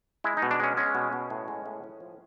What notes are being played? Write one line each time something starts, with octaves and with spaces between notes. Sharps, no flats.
G#3 E4
D#4
B2
D4
G#3 C#4
G#3 C#4
B2
B2
A2
G#3
A2
A2
F3